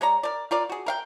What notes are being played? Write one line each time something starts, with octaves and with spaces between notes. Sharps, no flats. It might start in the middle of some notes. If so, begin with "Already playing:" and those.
G#3 C#5 D5 A#5
A#4 D5
F4 A#4 D5
F#4 G#4
A#4 F5 G5